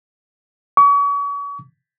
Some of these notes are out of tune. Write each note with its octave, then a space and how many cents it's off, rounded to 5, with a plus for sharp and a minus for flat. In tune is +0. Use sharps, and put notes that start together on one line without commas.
C#6 +40